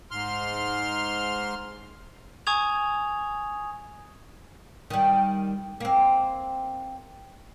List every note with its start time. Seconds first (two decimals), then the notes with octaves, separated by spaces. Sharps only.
0.11 G#2 C6 F6
2.47 G#5 C#6 D#6 G#6 F7
4.90 D#3 G3
5.80 A#3 C4